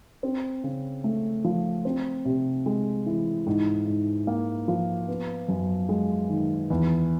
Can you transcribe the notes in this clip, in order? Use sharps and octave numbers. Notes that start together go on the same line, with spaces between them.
C4
C#3
A3
F3
C4
C3
G#3
E3
G#2
G#2
A#3
F3
B3
F#2
G#3
D#3
E2